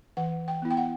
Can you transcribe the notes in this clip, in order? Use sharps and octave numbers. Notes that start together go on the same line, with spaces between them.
E3 F#5
G5
B3 E4
G5
F#5